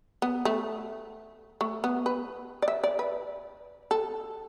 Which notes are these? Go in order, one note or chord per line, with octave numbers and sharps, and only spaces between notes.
B3
A3
A3
B3
B4
D5
E5
D5
B4
A4